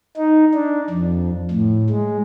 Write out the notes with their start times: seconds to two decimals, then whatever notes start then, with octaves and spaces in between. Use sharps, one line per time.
0.17 D#4
0.54 D4
0.90 F2
1.51 A2
1.90 G#3